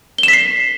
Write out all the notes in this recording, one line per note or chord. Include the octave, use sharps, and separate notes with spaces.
B6 C7 E7 G7